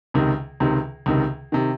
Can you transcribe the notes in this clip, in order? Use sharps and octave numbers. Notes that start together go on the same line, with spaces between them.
C#2 C3 D#3
C#2 C3 D#3
C#2 C3 D#3
C3 D#3